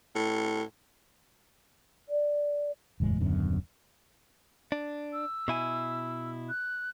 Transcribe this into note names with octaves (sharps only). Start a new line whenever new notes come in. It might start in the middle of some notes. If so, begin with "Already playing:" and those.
A2
D5
F#1 E2 A2 G#3
D#1 F#2 D3 B3
D4
E6
B2 E4 G#5
F#6